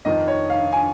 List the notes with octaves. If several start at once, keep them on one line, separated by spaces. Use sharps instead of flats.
F1 F2 D#3 D#5
C#5
F5
G#5